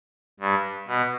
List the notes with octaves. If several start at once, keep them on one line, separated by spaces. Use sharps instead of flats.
G2
B2